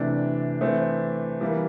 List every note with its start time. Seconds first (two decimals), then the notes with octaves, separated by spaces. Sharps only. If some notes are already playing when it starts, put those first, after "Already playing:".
Already playing: C3 E3 A3 D4 D5
0.61 E3 A3 C4
1.41 E3 G3 A#3